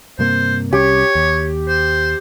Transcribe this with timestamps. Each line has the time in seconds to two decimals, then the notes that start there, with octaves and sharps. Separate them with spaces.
0.19 G2 C3 A#3 C5
0.72 C2 C#4 G4 C#5
1.15 D#2
1.68 C5